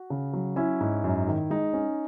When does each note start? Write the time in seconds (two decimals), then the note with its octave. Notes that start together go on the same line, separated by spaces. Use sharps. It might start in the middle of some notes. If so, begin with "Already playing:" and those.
Already playing: F#4
0.10 C#3
0.33 F#3
0.56 C#4 E4
0.80 G#2
1.04 F#2
1.27 D#3
1.50 G#3 D#4
1.73 C#4